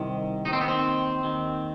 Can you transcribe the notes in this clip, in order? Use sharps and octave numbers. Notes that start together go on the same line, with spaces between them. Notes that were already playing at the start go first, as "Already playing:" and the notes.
Already playing: C2 C3 D#3
D#2 D#3 D#4
C4
B3
C4
D#2 D#3